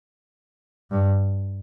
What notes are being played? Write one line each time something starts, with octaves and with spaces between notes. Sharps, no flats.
G2